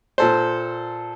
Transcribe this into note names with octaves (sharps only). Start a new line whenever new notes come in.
A#2 A4 C5